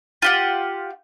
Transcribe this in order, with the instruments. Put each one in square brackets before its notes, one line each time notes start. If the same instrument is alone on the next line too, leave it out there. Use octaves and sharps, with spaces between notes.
[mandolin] F4 G4 F#5